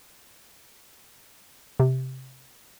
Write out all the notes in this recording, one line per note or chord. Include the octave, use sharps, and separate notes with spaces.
C3